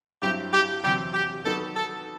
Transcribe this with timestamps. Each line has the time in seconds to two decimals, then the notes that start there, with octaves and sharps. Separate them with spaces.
0.22 G2 F#3 C4 E4 G4
0.53 G4
0.84 E2 C3 F#3 G4
1.14 G4
1.45 D#3 F#3 B3 D#4 F#4 A4
1.77 A4